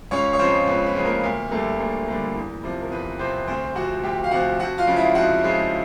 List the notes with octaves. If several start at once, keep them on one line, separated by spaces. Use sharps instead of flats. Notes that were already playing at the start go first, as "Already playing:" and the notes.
C#2 C#4 C#5
C#5
C#3 F3 G#3 C4 C5
C#2 B3 B4
B3 B4
C#3 F3 G#3
A#3 A#4
D2 A#3 A#4
D3 G3 A3 A#3 A4
D2 A#3 A#4
D3 G3 A#3
E2
C3 F3
A#4
E2 B3 B4
C3 F3 C4 C5
D2 C4 C5
C3 F3 F#4 F#5
D2 G4 G5
F5
C3 F3 F#4 F#5
F2 F#4 F#5
F4 F5
C#3 F3 G#3
E4 E5
F2 F#4 F#5
C#3 F3 G#3